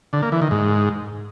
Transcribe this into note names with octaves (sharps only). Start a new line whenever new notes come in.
D3
A#3
E3
D#3
G#2